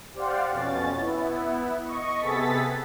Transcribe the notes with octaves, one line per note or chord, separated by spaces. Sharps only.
G4 C5 D5 F5 F#5
F2 B2 C#4 A6
B3 E4
D#5 C#6
C3 B3 G#4 A4 A6 B6